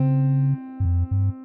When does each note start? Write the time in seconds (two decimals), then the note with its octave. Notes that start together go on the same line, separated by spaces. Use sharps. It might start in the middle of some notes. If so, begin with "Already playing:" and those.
Already playing: C#3 C4
0.80 G2
0.85 F2
1.11 G2